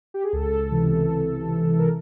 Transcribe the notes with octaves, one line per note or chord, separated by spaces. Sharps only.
G4
G#4
C#2 A4
C3 E3
C#2
C3 E3
A#4